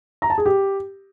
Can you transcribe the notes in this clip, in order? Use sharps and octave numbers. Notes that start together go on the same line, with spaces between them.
A#5
A5
G#4
G4